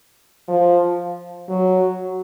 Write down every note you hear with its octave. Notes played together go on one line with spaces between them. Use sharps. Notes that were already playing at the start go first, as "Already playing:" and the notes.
F3
F#3